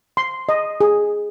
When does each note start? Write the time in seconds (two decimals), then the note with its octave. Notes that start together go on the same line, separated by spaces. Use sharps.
0.17 C6
0.49 D#5
0.81 G#4